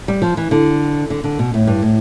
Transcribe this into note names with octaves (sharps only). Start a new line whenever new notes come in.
G3
F3
E3
D3
D3
D3
B2
A2
G2
A2